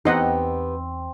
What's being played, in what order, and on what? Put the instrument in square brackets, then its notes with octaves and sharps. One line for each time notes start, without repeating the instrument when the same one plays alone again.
[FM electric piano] E2 [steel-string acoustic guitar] B3 G4 [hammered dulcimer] C4 [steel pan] D#4 D#5 F#5